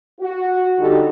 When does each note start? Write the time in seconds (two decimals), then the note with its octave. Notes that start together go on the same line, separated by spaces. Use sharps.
0.20 F#4
0.79 D3 G3 D#4 G4 A4